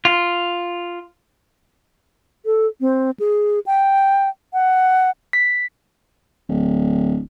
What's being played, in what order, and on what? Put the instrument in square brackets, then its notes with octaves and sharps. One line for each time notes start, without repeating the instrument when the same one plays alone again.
[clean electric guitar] F4
[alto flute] A4
C4
G#4
G5
F#5
[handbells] B6
[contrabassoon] D1